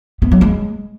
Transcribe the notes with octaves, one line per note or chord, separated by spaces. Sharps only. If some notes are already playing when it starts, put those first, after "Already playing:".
B3
F#3
G#3